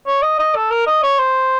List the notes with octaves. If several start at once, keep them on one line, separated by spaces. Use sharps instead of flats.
C#5
D#5
D#5
A4
A#4
D#5
C#5
C5